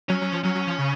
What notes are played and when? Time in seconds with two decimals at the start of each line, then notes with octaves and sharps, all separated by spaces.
0.09 F#3 C#4
0.21 F#3
0.32 F3
0.43 F#3 C#4
0.55 F#3
0.67 F3
0.79 C#3